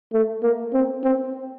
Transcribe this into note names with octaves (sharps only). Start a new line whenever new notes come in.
A3
A#3
C4
C4